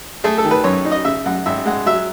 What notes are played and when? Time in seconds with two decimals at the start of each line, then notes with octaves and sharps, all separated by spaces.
0.24 A3 G#4
0.38 A4
0.45 D#3
0.51 B4
0.64 F#2 C#5
0.85 D#4
0.92 D#5
1.05 C#3 E5
1.26 F#2 F#5
1.46 G#1 E5
1.65 G#3 F#5
1.86 F#3 E5